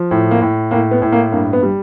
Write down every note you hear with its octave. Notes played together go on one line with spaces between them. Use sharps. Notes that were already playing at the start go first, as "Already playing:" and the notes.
Already playing: F3
A2
A#3
A2
A2 A#3
B3
A2
A#3
G2 A#3
B3
G3